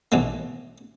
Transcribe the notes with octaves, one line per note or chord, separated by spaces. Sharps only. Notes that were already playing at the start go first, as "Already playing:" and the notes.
B1 E3 A#3